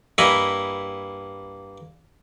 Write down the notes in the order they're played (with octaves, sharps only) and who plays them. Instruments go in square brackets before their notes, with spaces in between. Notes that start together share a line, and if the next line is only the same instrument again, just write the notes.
[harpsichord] G2 A#3 E4 D#5 G#5 B5